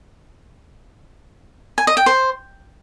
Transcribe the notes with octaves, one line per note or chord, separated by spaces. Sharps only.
G#5
D#5
G5
C5